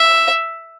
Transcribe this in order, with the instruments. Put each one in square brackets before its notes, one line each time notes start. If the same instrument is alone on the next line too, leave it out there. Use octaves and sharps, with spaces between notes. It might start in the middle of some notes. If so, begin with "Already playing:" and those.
Already playing: [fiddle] E5